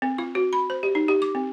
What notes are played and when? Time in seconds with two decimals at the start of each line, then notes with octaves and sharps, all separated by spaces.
0.02 C4
0.18 F4
0.35 F#4
0.53 B5
0.70 C5
0.83 G4
0.95 D#4
1.08 G4
1.22 D6
1.35 C4